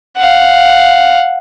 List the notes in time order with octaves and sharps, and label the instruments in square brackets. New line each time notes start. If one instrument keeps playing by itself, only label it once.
[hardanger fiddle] F5 F#5